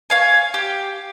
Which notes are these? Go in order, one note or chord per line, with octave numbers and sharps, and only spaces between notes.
C#5 F5 G#5
G4